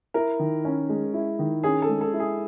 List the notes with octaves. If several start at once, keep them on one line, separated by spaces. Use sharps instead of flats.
E4 A#4
D#3
C#4
G#3
E4
D#3
C#4 G#4
A4
G#3
A4
E4
G#4